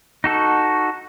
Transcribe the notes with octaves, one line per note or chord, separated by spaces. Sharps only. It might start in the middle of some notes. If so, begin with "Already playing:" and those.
D#4 F#4 A4